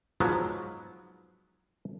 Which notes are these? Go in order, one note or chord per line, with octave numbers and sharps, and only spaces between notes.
G#2 F3 F#3 G#3 B3